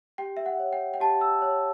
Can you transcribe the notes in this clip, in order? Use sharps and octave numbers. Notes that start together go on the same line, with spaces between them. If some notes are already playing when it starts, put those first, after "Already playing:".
G4 G5
E5
F#5
C#5
G5
G5
G4 A5
E6
C#5